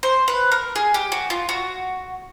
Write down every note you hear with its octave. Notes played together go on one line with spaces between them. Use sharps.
C5
B4
A#4
G#4
G4
F#4
F4
F#4